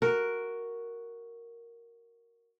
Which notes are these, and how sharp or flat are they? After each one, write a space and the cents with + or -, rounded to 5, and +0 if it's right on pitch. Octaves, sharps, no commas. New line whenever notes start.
F#4 +0 A#4 +0